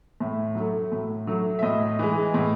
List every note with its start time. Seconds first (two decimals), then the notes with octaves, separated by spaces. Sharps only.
0.20 A2 E5
0.55 F#3 A3
0.92 A2
1.27 F#3 A3
1.59 E5
1.62 A2 D#5
1.99 E3 G#3
2.34 A2